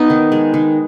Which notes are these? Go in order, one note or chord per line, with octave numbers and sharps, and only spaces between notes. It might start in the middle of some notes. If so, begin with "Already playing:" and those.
Already playing: B3 D#4
D#3
G#3
D#3